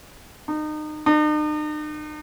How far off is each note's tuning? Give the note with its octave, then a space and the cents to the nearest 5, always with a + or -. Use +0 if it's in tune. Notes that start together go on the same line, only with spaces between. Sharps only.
D#4 -30
D#4 -45